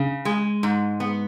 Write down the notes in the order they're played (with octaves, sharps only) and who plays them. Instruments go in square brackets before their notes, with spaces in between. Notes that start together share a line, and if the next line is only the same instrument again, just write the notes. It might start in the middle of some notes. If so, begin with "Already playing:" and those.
Already playing: [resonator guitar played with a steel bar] C#3
G#3
G#2
B3